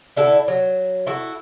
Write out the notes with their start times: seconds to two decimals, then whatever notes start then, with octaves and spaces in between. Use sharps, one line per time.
0.17 D3 E4 A4
0.48 F#3
1.07 E4 F#4 A4